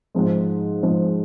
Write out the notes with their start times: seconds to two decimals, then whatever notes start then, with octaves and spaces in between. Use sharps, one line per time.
0.15 G#2 F3 G#3
0.83 G#2 F3 G#3